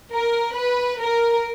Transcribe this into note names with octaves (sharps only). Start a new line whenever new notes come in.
A#4
B4
A#4